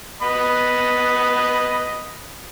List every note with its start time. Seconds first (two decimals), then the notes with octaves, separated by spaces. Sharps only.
0.22 B3 D#5 B5